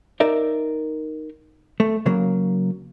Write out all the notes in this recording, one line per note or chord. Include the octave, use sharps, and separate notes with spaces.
D#4 A#4 D5 E5
A3
C#3 F#3 A#3